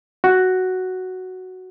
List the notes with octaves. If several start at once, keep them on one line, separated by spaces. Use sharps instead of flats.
F#4